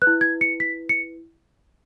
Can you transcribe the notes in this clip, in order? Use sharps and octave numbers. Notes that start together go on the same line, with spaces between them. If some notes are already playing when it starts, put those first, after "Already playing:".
B4 F#6
E4
G#6
C#7
B6
C#7